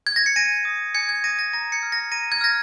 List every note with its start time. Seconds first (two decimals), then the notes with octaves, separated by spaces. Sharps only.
0.07 G#6
0.16 A#6
0.26 C#7
0.36 G#5 A#6 D#7
0.65 D#6
0.94 G#5 G#6 C#7
1.09 G#6 C#7
1.24 D#6 A#6 D#7
1.39 A#6
1.53 A#5 A#6
1.72 G#6 C#7
1.83 F6
1.92 A#6
2.12 A#5 A#6 D#7
2.32 G#6
2.41 F6 A#6